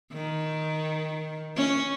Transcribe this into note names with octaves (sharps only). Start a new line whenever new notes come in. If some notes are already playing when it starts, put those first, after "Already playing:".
D#3
C#4